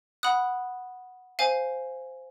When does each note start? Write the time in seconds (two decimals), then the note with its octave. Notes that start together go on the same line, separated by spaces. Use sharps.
0.23 F#5 B5 D#6 F#6
1.39 C5 F5 G#5